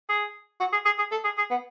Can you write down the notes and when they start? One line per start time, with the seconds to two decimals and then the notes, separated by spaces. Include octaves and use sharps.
0.09 G#4
0.60 F#4
0.73 G#4
0.85 G#4
0.98 G#4
1.11 A4
1.24 G#4
1.38 G#4
1.50 B3